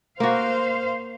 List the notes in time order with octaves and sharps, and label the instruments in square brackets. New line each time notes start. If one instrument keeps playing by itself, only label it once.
[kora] A#3 F#4 [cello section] C5 F5